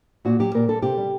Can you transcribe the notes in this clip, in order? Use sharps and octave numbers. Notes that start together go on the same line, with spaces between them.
A#2 F#4
F#3 G4
A#2 A#4
G3 A4
C3 G4
G3